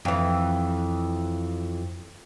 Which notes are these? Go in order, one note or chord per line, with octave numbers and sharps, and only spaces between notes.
F2 E3